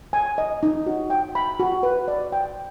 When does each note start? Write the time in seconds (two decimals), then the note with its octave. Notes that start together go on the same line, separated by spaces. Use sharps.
0.13 G#5
0.38 D#5
0.63 D#4
0.86 F#4
1.10 G5
1.35 B5
1.60 F#4
1.83 B4
2.08 D5
2.32 G5